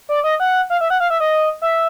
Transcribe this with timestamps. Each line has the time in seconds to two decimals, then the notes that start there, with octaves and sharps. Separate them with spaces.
0.09 D5
0.24 D#5
0.40 F#5
0.70 F5
0.81 E5
0.90 F#5
1.00 F5
1.10 E5
1.20 D#5
1.62 E5